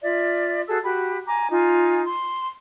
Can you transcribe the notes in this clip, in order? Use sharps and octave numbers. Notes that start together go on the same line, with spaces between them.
F4 D5 E5
F#4 G#4 A4 E6
F#4 G4 B5
G#5 A#5 D6
D#4 F4 G#5
C6